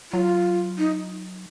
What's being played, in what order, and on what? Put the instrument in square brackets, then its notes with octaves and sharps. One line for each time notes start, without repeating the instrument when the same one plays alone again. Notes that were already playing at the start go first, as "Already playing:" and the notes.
[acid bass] F#3 [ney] F4
[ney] D#4